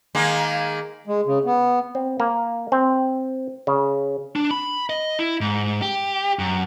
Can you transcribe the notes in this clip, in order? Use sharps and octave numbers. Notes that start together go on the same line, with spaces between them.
D#3 G#3 A#3
G#3
C#3
B3
C4
A#3
C4
C#3
D4
B5
D#5
E4
G#2
G4
F#2